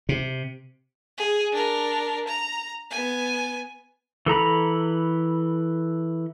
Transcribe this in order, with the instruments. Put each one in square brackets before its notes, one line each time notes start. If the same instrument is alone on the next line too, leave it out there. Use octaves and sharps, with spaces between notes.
[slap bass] C3
[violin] G#4
D4 A#4
A#5
B3 G#5
[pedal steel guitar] E3 A4 A#5 B5